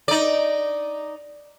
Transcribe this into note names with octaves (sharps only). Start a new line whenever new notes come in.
D#4 D5